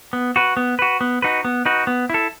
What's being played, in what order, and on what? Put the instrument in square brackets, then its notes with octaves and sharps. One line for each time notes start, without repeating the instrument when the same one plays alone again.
[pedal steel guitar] B3
F#4 B4
B3
F#4 B4
B3
D#4 F#4 B4
B3
D#4 F#4 B4
B3
E4 A4